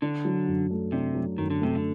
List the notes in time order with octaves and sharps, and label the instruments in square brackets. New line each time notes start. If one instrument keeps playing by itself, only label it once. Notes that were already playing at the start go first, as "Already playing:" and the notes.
[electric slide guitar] D3 [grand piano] D4
[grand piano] F#3
F#2
A3
[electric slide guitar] C3 [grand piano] D4
[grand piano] F#3
[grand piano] F#2 [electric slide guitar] D#3
[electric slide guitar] D3
[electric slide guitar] C3 [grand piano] A3
[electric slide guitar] D3